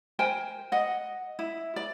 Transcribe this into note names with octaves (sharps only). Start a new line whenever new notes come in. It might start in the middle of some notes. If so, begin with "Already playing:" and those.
A#4 C5 G5 G#5
D#5 F#5
E4
D5